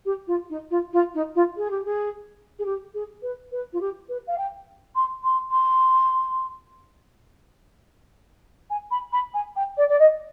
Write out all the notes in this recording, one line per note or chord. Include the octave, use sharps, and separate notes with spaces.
G4
F4
D#4
F4
F4
D#4
F4
G#4
G4
G#4
G#4
G4
G#4
B4
B4
F4
G4
B4
F5
G5
C6
C6
C6
G#5
B5
B5
G#5
G5
D5
D5
D#5